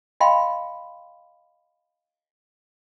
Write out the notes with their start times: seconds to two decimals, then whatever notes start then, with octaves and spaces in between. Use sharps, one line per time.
0.20 D#5 F5 G5 B5 C6